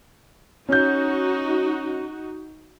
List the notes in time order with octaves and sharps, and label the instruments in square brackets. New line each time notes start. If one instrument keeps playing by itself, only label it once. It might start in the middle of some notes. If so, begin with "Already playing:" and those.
[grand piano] C#4 G6 [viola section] D#4 F#4